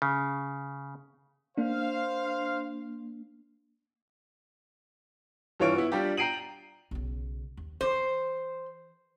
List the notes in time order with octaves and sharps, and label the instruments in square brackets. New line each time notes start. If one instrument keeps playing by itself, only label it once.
[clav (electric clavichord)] C#3
[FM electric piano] A#3 D4 [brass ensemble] C5 F5
[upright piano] G2 E3 F4 C#5 D7
B3 E4
G3 D4 F4 G4
G5 A#5 C7 D7 D#7 F#7
[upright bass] B1 C#3
D#2
[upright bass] E3 [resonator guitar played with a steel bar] C5